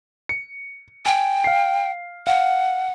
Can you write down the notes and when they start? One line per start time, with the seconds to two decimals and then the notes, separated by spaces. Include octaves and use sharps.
0.29 C#7
1.06 G5 G#5
1.44 F5 C7
2.27 F5 F#5